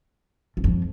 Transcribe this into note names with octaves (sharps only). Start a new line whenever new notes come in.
E2
F2